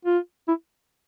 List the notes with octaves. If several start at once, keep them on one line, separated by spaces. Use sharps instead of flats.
F4
E4